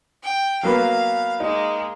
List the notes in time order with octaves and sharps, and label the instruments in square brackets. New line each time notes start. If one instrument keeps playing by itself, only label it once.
[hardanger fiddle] G5
[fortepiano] F#3 A#3 B3 [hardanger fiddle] F5
[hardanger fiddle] G#3 A#3 [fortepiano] D#4